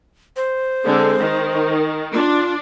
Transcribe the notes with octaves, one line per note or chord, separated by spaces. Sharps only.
C5
D3 G#3 C4
D#3
D4 F4